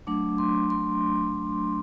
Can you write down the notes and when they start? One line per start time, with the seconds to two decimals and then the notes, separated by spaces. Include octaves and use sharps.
0.07 F#3 A3 D4 D6
0.38 C6
0.70 C6